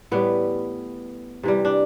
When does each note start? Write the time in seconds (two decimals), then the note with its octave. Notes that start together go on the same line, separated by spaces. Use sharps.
0.11 A2 E3 G3 B3
1.43 C3 E3 G3
1.65 D4